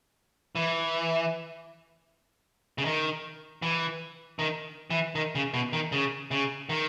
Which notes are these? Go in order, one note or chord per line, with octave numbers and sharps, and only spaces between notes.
E3
C#3
D#3
E3
D#3
E3
D#3
C#3
B2
D#3
C#3
C#3
D#3